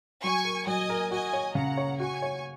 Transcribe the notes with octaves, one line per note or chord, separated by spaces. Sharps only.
F#3 G#5 C#6
A#4
F#3 D#5 G#5
A#4
F#4 D#5 G#5
C#5
C#3 F#5 A#5
C#5
F#4 G#5 C#6
C#5